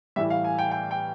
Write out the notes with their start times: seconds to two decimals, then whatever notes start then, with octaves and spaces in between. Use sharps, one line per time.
0.16 A2 E3 G3 E5
0.30 F5
0.44 G#5
0.59 G5
0.71 G5
0.91 G5